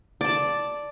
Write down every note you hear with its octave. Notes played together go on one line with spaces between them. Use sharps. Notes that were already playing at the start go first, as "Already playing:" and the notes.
D5 A5